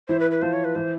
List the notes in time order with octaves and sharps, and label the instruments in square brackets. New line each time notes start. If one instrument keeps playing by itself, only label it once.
[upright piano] E3 E4 [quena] C5
[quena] B4
B4
[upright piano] F3 F4 [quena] C5
[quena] C#5
B4
[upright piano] E3 E4 [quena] C5